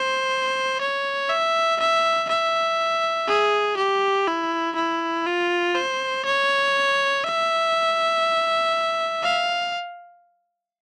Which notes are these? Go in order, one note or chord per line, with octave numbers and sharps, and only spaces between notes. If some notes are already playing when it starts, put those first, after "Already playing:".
Already playing: C5
C#5
E5
E5
E5
G#4
G4
E4
E4
F4
C5
C#5
E5
F5